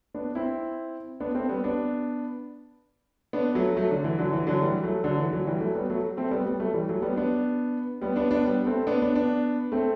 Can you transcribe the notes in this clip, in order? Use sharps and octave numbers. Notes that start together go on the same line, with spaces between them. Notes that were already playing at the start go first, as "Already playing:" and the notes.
B3 D4
C4 E4
B3 D4
A3 C4
G3 B3
B3 D4
B3 D4
F#3 A3
F#3 A3
D3
E3
D3 F#3
E3
D3 F#3
E3 G3
F#3 A3
D3 F#3
E3
D3 F#3
E3 G3
F#3 A3
G3 B3
F#3 A3
A3 C4
G3 B3
G3 B3
F#3 A3
E3 G3
F#3 A3
G3 B3
B3 D4
G3 B3
B3 D4
B3 D4
G3 B3
A3 C4
B3 D4
B3 D4
B3 D4
A3 C4